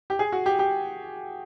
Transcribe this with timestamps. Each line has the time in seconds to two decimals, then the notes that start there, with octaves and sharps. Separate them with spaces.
0.10 G4
0.19 G#4
0.32 F#4
0.46 G4
0.59 G4